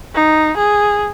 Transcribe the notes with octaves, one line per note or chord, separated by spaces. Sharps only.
D#4
G#4